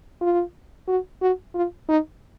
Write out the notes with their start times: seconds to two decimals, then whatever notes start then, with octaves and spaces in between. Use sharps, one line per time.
0.21 F4
0.88 F#4
1.22 F#4
1.55 F4
1.88 D#4